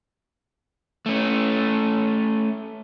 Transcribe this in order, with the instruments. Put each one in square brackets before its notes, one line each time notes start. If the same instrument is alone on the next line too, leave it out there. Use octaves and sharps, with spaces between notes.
[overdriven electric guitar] A3 C#4